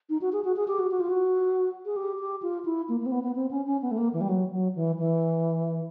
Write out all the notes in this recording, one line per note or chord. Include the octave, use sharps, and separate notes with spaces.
D#4
F#4
G#4
F#4
G#4
G4
F#4
F#4
F4
F#4
G#4
G4
G4
F4
E4
A#3
A#3
C4
B3
B3
C4
C#4
C#4
B3
A3
A#3
E3
G3
F#3
F#3
E3
E3